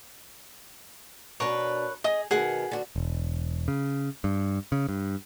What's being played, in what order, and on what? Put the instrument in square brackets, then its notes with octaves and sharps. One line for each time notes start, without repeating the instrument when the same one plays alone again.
[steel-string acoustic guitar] B2 D4 [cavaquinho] A#4 B4 C#5
[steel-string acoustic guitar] G#4 [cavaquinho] D#5 D#6
[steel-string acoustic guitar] B2 D#3 B3 [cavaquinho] G#4 F#5
[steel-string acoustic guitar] D3 F#4
[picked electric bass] E1
C#3
G2
C#3
G2